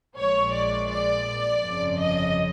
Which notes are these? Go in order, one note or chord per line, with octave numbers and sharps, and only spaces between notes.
A#1 A#2 F3 G#3 C#5
D5
D5
G1 F2 C#3 F3
D#5